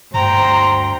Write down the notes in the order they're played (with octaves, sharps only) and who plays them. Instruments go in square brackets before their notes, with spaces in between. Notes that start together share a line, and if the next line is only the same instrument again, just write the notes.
[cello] D2 G5 [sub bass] G2 [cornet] C5 [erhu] A#5